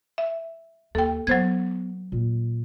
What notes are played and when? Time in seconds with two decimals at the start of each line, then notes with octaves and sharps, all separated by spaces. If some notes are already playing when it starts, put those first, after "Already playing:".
0.18 E5
0.95 D#2 A4 G5
1.27 F#3 B3 C5 G#6
2.12 A#2